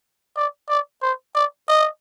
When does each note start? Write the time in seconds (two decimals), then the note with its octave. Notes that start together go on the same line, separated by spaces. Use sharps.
0.37 D5
0.69 D5
1.02 C5
1.35 D5
1.68 D#5